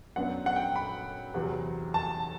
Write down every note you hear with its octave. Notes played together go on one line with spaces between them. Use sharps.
F#2 F#3 B3 D4 F#5
F#5
G5
B5
E2 C3 F#3
A5